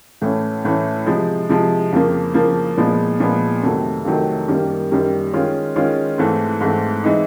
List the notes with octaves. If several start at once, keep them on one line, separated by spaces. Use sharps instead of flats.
A2 E3 A3 C#4
A2 E3 A3 C#4
C3 F3 G#3
C3 F3 G#3
F2 C#3 F3 A#3
F2 C#3 F3 A#3
A#2 F3 G#3 B3
A#2 F3 G#3 B3
F2 C3 D#3 F#3 A3
F2 C3 D#3 F#3 A3
F#2 D#3 G3 A#3
F#2 D#3 G3 A#3
D#3 G#3 C#4 F4
D#3 G#3 C#4 F4
G#2 E3 A3 C4
G#2 E3 A3 C4
E3 G#3 C4 D#4